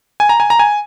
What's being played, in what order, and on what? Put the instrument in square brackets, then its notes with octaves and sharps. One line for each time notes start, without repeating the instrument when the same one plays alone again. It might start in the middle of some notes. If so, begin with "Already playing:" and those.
[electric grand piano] G#5
A#5
G#5
A#5
G#5